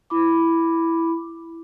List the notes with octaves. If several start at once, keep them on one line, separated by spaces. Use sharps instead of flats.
E4 B5 D6